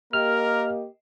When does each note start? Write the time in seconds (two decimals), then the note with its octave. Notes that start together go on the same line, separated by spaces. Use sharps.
0.13 A#3 G4 A#4 D#5 F6